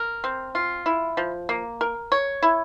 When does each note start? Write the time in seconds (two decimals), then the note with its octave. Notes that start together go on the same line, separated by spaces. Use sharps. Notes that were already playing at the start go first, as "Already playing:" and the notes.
Already playing: A#4
0.24 C4
0.55 F4
0.86 E4
1.17 F3
1.49 A#3
1.81 A#4
2.12 C#5
2.42 E4